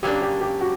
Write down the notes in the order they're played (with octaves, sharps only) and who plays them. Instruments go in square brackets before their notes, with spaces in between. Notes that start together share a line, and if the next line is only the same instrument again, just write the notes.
[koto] C#3 F#3 A#3 D4 [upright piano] G4
[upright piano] G4
G4
F#4